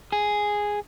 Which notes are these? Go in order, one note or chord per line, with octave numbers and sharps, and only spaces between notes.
G#4